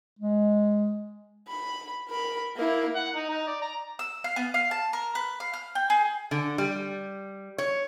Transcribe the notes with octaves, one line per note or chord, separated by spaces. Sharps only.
G#3
B5
A#4 B5
A#3 E4
F#5
D#4
D#4
D5
A#5
E6
F5
B3
F5
A5
A#4
B4
F5
F6
G5
G#4
D3
G3
C#5